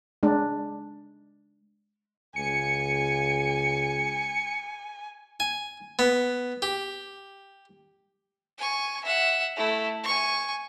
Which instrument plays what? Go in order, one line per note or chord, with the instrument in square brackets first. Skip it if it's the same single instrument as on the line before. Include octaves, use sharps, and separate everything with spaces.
[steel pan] G#3 D4
[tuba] C#2 [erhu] G#5 [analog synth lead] C#7
[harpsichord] G#5
B3
G4
[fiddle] G#5 C#6
E5 F#5
A3 E4
G#5 C#6